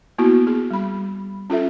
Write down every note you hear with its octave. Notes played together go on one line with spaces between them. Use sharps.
A#3 B3 E4 F#4
G#4
G3 B5
C#4 F4 A4 E5